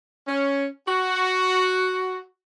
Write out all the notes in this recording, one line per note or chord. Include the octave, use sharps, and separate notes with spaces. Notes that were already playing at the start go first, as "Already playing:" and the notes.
C#4
F#4